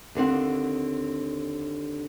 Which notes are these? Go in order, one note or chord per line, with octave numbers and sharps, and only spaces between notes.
D#2 D3 C4 F#5